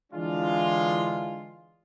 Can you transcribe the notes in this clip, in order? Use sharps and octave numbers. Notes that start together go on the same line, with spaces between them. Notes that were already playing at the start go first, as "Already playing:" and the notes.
D3 E3 G#3 D4 E4 F4